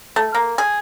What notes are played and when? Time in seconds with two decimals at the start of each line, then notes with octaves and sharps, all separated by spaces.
0.16 A3
0.35 A#3
0.58 G#4